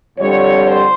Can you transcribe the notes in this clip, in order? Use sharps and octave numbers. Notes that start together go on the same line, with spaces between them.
F2 D3 G3 C#5
C5